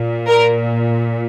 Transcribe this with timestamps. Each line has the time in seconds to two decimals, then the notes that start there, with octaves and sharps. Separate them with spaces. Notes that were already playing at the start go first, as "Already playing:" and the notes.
Already playing: A#2
0.27 A#4